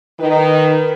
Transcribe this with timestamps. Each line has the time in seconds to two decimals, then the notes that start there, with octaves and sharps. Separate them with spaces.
0.19 D#3 B4